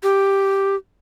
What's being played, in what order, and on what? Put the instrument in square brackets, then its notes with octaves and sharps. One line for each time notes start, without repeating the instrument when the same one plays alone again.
[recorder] G4